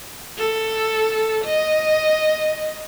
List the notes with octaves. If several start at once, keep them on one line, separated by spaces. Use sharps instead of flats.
A4
D#5